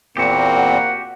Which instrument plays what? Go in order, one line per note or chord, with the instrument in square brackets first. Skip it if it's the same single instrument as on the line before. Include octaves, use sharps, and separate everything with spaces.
[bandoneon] E2 A#2 C4 [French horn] A#3 [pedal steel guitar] F#4 G4
[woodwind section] F#5